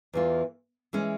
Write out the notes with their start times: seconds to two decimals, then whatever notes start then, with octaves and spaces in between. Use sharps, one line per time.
0.13 E2 E3 A#3 F4
0.93 E3 G#3 C#4